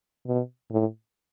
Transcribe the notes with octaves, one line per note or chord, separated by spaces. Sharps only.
B2
A2